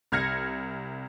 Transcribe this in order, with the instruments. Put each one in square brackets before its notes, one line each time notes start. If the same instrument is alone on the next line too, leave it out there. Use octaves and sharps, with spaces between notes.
[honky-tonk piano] C2 F6 G#6 A#6 C#7